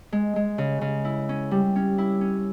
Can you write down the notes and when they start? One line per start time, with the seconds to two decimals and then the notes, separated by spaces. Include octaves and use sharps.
0.12 G#3
0.36 G#3
0.58 C#3
0.81 C#3
1.05 E4
1.29 C#4
1.51 G3
1.76 C#4
1.98 E4
2.21 C#4